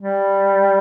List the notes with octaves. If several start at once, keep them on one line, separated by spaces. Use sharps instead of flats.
G3